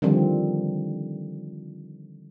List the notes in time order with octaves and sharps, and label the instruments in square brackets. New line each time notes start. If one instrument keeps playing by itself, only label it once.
[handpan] D3 D#3 F3 G3 C4